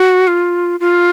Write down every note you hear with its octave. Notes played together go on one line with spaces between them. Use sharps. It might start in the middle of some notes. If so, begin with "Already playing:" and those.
Already playing: F#4
F4
F4